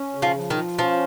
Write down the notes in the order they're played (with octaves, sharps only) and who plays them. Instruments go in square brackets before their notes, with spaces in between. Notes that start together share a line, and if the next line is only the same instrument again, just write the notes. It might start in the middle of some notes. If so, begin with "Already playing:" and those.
Already playing: [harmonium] C#4
C#3
[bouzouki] F3
[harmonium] F3
[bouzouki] D#3
[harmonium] F4
[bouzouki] F3 [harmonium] C#4